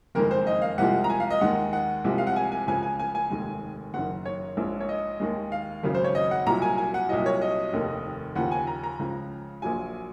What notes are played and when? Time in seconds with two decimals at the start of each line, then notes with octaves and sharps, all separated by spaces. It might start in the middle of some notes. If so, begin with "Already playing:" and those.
0.15 F#1 F2 D#3 G#3 A#4
0.31 C5
0.47 D#5
0.62 F5
0.78 C2 C3 F3 G#3 F#5
1.04 A#5
1.10 G#5
1.20 F5
1.30 D#5
1.41 D#2 D#3 G#3 F#5
1.73 F#5
2.04 C2 C3 F3 G#3
2.18 F5
2.27 F#5
2.36 G#5
2.52 G#5
2.67 C#2 C#3 F3 G#5
2.83 G#5
2.99 G#5
3.15 G#5
3.30 F1 D#2 D#3 G#3
3.94 F#1 F#2 D#3 F#5
4.25 C#5
4.57 A#1 G#2 F3 G#3
4.80 C#5
4.89 D#5
5.20 D#2 D#3 G#3
5.52 F5
5.83 G#1 F#2 C#3 F#3
5.94 C5
6.04 C#5
6.15 D#5
6.31 F#5
6.46 C2 A#2 F#3 A#5
6.62 G#5
6.78 G#5
6.94 F#5
7.09 C2 A#2 F#3 D#5
7.26 C#5
7.42 D#5
7.73 F1 D#2 D#3
8.36 D#2 C#3 F3 F#5
8.52 G#5
8.67 A#5
8.83 A#5
8.99 C#2 C#3 F3
9.62 A#1 A#2 F#3 G#5